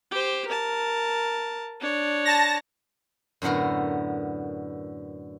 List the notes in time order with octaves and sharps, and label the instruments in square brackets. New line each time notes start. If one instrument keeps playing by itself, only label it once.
[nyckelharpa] G4 C5
A#4 A5
D4 C#5
[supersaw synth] A5 A#6
[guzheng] F#2 A2 D3 B3 A#4